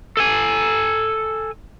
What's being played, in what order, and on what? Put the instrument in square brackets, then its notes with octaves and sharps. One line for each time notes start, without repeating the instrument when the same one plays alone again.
[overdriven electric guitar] A4 G#5